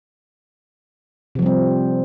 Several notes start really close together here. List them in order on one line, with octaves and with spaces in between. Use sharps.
C3 F3 G3 C4